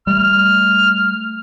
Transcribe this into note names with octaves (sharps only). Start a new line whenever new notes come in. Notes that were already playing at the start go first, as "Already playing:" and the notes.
G3 A3 F6